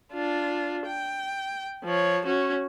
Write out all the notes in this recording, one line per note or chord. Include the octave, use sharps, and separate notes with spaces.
D4 F4
G5
F3 C#5
C#4 F#4